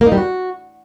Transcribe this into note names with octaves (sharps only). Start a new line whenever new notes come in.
A#3
D#4
G3
F#4